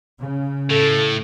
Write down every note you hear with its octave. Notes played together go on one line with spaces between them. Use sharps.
C#3
A2 A4